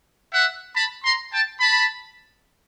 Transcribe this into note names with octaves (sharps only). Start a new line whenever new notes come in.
E5 F#5
A5 B5
A#5 C6
G5 A5
A5 B5